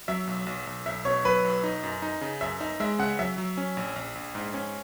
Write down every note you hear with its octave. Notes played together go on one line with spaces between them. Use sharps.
F#3 E5
B1
B1
B1
B1 E5
B2 C#5
F#3 B4
B1
D#4
F#2
D#4
C#3
F#2 E5
D#4 E5
G#3 E5
C#3 F#5
F#3 E5
F#3
C#4
A#1
A#1
A#1
G#2
C#4